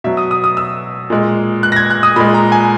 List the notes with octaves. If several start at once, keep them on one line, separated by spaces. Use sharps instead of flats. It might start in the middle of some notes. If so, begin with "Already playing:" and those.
B2 F#3 E5
D#6
D#6
D#6
E6
A#2 G#3
F#6
A#6
G#6
F#6
D#6
A#2 G#3 B5
A#5
G#5